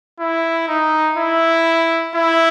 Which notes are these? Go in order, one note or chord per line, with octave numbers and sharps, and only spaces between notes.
E4
D#4
E4
E4